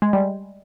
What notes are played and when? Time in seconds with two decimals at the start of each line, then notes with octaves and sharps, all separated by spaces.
0.02 G#3
0.13 G3